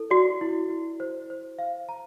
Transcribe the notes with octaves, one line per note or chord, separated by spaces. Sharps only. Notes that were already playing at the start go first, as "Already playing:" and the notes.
Already playing: E4 A4
F#4 D5
E4
E4
C5
C5
F5
A#5